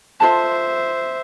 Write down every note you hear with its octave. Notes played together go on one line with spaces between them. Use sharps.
F4 A4 C5 E5 A5